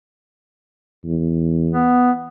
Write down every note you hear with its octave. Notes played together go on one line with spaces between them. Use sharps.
E2
B3